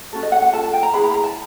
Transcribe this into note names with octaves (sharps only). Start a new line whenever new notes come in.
C#4 F#4 A4
D#5
F#5
F#5
F4 A4 A5
A5
G5
A#5
E4 G#4 B4 B5
A#5
B5
A#5
A5